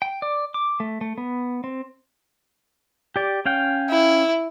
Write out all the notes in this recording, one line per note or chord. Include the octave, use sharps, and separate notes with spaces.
G5
D5
D6
A3
A3
B3
C4
G4 D5
C#4 F5 G5
E4